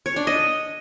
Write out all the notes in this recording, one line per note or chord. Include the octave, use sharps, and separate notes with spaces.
C#5
D4
D#5